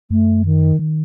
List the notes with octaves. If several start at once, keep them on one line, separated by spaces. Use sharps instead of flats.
F#2 A3
D#3
D#3